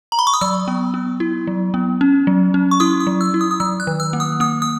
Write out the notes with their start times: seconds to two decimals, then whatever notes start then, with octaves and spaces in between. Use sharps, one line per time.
0.12 A#5
0.19 B5
0.27 C#6
0.34 D#6
0.41 F#3 E6
0.68 B3
0.94 B3
1.20 E4
1.47 F#3
1.74 B3
2.01 C#4
2.27 F#3
2.54 C#4
2.71 C#6
2.80 E4 D#6
3.00 D#6
3.07 F#3
3.21 E6
3.34 E4
3.41 D#6
3.51 D#6
3.60 F#3 E6
3.80 F#6
3.87 D#3
4.00 E6
4.13 A#3
4.20 D#6
4.40 A#3 D#6
4.62 D#6